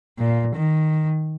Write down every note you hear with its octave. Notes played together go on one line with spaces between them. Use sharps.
A#2
D#3